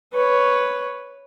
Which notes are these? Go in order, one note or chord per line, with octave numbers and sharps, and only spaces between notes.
B4 C#5